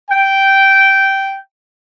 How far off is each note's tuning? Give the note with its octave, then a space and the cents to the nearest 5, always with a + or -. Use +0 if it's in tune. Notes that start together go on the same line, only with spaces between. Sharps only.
G5 -10